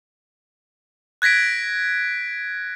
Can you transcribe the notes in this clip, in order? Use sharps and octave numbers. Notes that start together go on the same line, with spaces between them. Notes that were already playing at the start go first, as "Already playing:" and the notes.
F#6 G#6 A#6 B6 D7